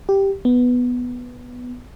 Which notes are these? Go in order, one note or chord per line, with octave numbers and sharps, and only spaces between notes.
G4
B3